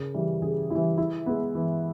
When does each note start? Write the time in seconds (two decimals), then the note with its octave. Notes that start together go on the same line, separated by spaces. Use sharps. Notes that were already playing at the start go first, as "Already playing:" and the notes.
Already playing: C#3 A#4
0.14 E3 G3
0.42 C#3 G#4
0.70 E3 G3 E4
0.98 E3 E4
1.26 G#3 B3
1.55 E3